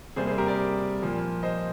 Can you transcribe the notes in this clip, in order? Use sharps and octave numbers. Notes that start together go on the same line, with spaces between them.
C3 G3 A#3 G#4 C5
G#4 C5
G4 A#4
A#4 D5
A#2 F3 A#3
C5 D#5